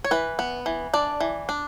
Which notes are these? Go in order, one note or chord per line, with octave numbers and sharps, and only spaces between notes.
C#5
E3 B4
B3
E3
D4 D5
E3
D4